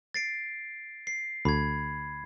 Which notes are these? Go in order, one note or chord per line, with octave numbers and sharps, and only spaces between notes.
A6 C7 D7
C7
D2 B5 G#6